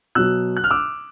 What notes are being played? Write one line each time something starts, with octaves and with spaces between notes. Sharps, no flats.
B2 F#3 E6 F#6
F#6
F6
D6 E6